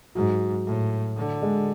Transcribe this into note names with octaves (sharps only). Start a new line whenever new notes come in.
G#2 F#3
A2
D3
G#3